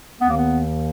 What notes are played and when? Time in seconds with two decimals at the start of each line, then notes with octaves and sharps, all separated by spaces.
0.21 D#2 D#3 B3
0.29 A#3
0.37 B3